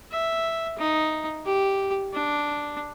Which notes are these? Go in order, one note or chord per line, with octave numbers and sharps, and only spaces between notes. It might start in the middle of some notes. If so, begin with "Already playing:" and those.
E5
D#4
G4
D4